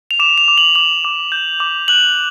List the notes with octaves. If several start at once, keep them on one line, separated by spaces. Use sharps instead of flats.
F7
D6 E7
F7
D6
F#7
D6 F#7
D6
G6
D6
F#6 F#7